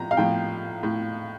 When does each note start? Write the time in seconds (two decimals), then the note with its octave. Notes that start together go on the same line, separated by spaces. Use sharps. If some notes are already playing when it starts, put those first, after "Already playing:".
Already playing: A2 F3 A#5
0.11 F5
0.17 A2 F3 G5
0.83 A2